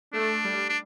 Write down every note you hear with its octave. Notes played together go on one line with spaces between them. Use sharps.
A3 D4
G3
D4